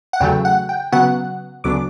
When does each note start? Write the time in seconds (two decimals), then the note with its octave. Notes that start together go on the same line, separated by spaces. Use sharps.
0.13 F#5
0.20 E2 C#3 F#3 A3 G5
0.45 F#5
0.69 G5
0.92 C#3 F#3 B3 F#5
1.64 D2 C#3 F#3 B3 D4 D6